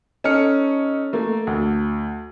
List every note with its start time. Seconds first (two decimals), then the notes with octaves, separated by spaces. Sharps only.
0.24 C#4 D#4 A4 F6 C#7
1.13 A3 A#3
1.47 D2